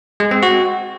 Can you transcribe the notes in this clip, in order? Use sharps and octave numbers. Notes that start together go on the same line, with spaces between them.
G#3
C4
F#4